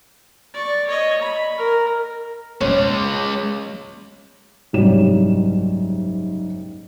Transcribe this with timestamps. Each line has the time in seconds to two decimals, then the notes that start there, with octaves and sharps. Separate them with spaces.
0.54 D5 C#6
0.87 C#5 D#5
1.21 B5
1.58 A#4
2.61 G#3 C#4 C#5
4.73 F#1 C2 G#2 G3 C#5 E7